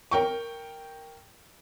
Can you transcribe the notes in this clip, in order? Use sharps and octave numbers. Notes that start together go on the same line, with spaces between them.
A#4 G5 C#6